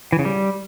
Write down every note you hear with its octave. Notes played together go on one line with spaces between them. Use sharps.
E3
C#3
G3